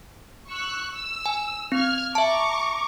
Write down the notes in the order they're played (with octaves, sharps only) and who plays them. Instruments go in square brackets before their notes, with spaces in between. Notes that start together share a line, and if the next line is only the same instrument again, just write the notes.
[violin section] C#6 E6 F#6
E6
[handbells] G#5
[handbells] C4 [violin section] F6 G#6
[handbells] E5 A5 [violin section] A#5 C#6 D6